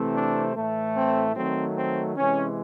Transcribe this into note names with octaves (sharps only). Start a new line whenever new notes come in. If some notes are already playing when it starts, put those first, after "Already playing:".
Already playing: C3 E3 A3 C4
D4
A2 E3 A3
C4
D#3 F#3 A3 C4
C4
C3 E3 G#3 C#4